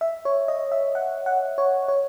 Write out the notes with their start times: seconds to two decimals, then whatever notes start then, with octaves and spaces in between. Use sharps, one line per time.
0.01 E5
0.25 C#5
0.48 D#5
0.72 E5
0.95 F#5
1.26 F#5
1.58 C#5
1.88 C#5